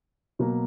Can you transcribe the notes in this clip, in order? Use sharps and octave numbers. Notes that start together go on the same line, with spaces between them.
B2 F#3 A#3